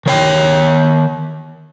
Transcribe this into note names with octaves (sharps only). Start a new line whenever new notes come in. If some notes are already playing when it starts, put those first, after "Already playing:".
D#3 C#5 G5